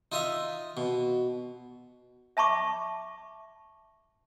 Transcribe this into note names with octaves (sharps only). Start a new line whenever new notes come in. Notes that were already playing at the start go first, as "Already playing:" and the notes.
D#4 F4 D#5 E5 A#5
B2
E5 A5 B5 C#6 D6